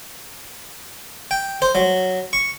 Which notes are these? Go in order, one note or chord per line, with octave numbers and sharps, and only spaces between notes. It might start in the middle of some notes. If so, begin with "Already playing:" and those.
G5
C5
F#3
C#6